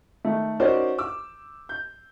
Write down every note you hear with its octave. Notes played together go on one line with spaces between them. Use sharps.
D#3 A3
C#4 D#4 F#4 A#4 C5 D5
D6 E6
G6